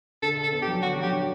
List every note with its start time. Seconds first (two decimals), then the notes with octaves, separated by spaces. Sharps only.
0.22 D3 A4
0.37 D3
0.43 A4
0.52 B3
0.62 G4
0.67 F#3
0.82 D3 F#4
0.98 F#3 G4
1.12 D3